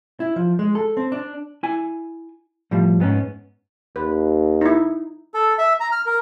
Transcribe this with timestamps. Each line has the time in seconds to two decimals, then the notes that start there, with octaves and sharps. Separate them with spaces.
0.20 E4
0.36 F3
0.59 G#3
0.75 A4
0.97 C4
1.12 D4
1.63 E4 G#5
2.71 A2 F3 G3
3.00 G#2 B3 C#4
3.96 D#2 B4
4.61 D#4 E4
5.34 A4
5.59 E5
5.80 A#5
5.92 F6
6.06 A#4